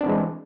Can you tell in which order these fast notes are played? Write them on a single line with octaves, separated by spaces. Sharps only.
D4 C4 E3 G#3